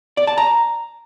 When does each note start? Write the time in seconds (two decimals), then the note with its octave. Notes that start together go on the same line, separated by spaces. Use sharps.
0.17 D5
0.27 A5
0.38 A#5